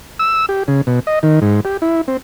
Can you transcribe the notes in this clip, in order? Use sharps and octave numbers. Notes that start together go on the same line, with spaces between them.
E6
G4
C#3
B2
D#5
D#3
G#2
G4
E4
C4